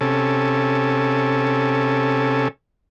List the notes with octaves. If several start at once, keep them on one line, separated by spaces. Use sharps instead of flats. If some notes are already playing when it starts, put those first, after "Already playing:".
C3 C#4 A4